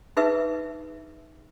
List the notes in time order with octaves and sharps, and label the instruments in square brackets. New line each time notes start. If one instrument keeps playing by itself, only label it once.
[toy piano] D#4 G#4 B4 E5 E6